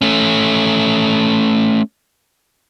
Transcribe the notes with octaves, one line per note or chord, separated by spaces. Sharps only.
A3 C#4